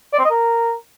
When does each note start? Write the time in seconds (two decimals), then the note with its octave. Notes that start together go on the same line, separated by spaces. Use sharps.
0.13 D5
0.19 C4
0.25 D#5
0.31 A#4